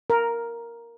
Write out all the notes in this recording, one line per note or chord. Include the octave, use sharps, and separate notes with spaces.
A#4